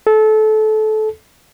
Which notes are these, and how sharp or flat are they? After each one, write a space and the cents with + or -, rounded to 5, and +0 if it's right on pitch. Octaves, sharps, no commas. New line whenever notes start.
A4 -25